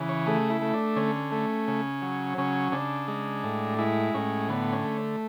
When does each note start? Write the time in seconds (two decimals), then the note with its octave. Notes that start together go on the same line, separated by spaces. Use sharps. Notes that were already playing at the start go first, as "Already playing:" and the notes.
Already playing: C#3 E3
0.09 C#5
0.26 A3 G#4
0.50 E4
0.61 A3
0.74 D4
0.96 D3 C#4
1.31 A3
1.68 C#3
2.02 F#3
2.38 C#3 C#4
2.72 C#3 D4
3.08 G#3
3.44 A2
3.78 G#3 E4
4.14 A2 C#4
4.49 D3 B3
4.73 C#4
4.84 A3